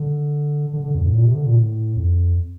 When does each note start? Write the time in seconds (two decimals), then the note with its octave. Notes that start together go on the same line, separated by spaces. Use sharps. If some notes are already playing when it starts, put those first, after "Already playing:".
Already playing: D3
0.73 D3
0.84 D3
0.95 F2
1.05 A2
1.15 A#2
1.25 C3
1.35 D3
1.46 A#2
1.56 A2
1.96 F2